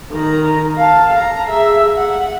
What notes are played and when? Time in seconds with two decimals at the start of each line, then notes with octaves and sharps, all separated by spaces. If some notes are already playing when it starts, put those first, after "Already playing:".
0.12 D#3 A#5
0.78 F5 A5
1.18 A#5
1.49 G#4 E5
1.97 F#5